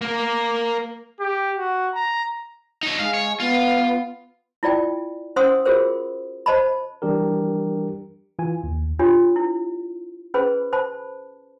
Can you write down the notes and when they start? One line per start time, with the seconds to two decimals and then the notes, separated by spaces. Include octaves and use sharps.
0.01 A#3 A#4
1.21 G4
1.57 F#4
1.95 A#5
2.83 D#4 C#5
2.99 G#3 F5
3.14 C#5
3.40 B3 F4
4.63 E4 F4 D5 G5 G#5
5.36 C#4 C5 F#5 C6 D#6 E6
5.65 F4 F#4 G#4 A#4 C5
6.46 C5 D#5 A5 B5
7.02 E3 G3 D4 G4 A#4
8.38 E3 F4 G#5
8.63 D#2
8.99 D4 F4 G4 C#5
9.36 E4
10.34 C#4 G#4 B4 C5 B5
10.73 C5 A5 B5